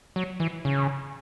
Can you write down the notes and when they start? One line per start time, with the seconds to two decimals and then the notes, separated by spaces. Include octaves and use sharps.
0.16 F#3
0.40 E3
0.65 C#3